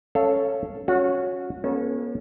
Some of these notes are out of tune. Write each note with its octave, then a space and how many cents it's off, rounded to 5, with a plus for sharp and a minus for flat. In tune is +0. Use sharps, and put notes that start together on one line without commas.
C#4 +0 A4 +0 F5 -20
C#4 +0 F#4 -30
A#3 +40 C#4 -20 A4 -20